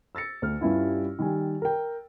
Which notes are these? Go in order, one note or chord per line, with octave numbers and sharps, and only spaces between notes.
E6 A6 A#6 C#7
D2 F6
G2 G3 C#4 E4 F4
D#3 G3 G#5
A#4 G5